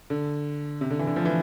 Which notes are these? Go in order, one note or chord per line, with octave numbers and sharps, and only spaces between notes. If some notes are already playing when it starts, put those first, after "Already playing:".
D3
C3
D3
E3
D3
F3
E3